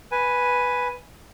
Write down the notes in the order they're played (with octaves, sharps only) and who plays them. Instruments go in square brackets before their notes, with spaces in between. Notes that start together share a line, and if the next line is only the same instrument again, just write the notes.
[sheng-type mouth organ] B4 G#5